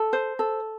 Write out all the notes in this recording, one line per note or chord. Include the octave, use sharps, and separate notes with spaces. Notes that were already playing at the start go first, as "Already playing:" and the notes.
Already playing: A4
C5
A4